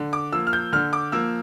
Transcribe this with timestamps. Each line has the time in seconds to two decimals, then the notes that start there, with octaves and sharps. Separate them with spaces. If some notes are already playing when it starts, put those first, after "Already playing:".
Already playing: D3
0.13 D6
0.32 F3 A#3 E6
0.47 F6
0.53 G6
0.73 D3 F6
0.93 D6
1.12 F3 A#3 E6